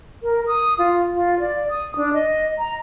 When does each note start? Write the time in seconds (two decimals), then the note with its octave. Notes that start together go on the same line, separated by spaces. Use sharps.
0.23 A#4
0.47 D#6
0.79 F4
1.14 F4
1.40 D5
1.69 D#6
1.96 D4
2.14 D#5
2.58 A#5